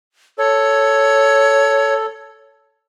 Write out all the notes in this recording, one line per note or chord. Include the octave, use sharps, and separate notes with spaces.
A4 C#5